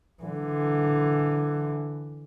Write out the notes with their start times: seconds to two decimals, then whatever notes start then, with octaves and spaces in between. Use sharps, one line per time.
0.23 D3 E3